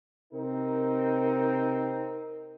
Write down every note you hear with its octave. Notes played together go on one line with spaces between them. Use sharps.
C3 C4 D#4 A#4